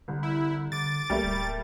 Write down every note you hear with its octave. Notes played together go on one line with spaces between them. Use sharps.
C2 D3
E4
D3 D6 A6
B1 G3 A3 A#3
D1